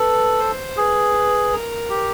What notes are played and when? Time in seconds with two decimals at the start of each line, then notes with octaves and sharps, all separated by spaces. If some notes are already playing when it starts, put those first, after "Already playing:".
Already playing: A4 B4
0.41 C5
0.77 G#4 B4
1.53 A#4
1.90 G4